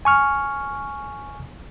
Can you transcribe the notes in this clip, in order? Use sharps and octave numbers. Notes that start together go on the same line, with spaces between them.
G#5 C#6 F6